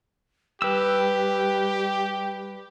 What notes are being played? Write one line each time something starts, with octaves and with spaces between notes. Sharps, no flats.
G3 G4 B4 G5 E6